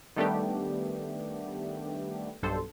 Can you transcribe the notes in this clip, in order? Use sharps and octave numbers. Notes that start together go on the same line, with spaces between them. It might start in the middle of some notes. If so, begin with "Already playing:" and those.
D#3 G3 A3 B3 D4 G4
B1 G2 A4 C5